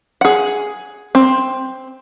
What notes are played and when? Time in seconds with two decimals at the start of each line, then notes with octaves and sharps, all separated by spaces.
0.21 G#4 F#5
1.15 C4